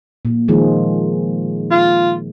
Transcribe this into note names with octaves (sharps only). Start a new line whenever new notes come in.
A#2
D#3 F3 G#3
F4